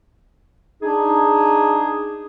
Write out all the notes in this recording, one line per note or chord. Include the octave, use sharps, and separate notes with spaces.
D4 D#4 G#4